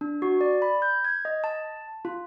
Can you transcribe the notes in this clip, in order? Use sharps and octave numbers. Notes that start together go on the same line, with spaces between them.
D4
F#4
D5
B5
G6
G#6
D#5
A5
F4